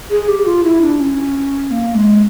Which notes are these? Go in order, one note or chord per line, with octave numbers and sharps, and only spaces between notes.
G#4
G4
F4
E4
D4
C#4
A#3
G#3